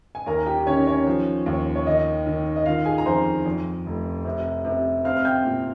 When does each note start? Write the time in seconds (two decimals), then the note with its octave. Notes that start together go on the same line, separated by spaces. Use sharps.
0.15 G#5
0.26 D#2 A#4 A#5
0.46 G4 G5
0.67 D#3 C#4 C#5
0.87 C#4 C#5
1.06 F3
1.46 D#2
1.75 C#5
1.86 D#3 D#4 D#5
2.27 D#3
2.56 D#5
2.66 D#3 F4 F5
2.85 G#4 G#5
2.98 A#5
3.05 F2 C5 C6
3.46 F2
3.86 F1
4.25 C3
4.65 C3
5.04 C4 F5 F6
5.17 F6
5.25 G5 G6
5.45 A#2